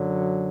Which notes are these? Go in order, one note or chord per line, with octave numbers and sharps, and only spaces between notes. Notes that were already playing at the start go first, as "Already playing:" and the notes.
Already playing: F#2 D3 F#3